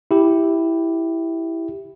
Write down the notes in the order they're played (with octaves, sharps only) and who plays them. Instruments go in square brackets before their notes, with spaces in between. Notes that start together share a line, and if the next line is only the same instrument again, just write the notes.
[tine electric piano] E4 G4